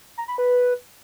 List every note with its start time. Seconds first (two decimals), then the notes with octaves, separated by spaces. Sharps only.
0.18 A#5
0.28 B5
0.38 B4